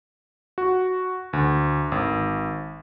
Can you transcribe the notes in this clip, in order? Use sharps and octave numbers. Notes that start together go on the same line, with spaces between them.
F#4
D2
G#1